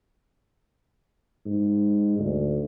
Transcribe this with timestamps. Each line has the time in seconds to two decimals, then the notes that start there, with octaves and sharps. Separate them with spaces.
1.46 G#2
2.19 D2